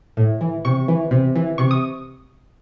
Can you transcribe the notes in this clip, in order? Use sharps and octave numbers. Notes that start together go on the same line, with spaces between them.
A2
E3
C3 C#6
E3
C3
E3
C3 C#6
D#6